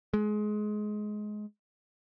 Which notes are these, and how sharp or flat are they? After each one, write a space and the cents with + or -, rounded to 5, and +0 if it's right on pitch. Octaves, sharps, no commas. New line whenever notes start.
G#3 +20